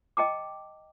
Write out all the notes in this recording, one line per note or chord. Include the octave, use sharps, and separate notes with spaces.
D#5 G5 A5 D6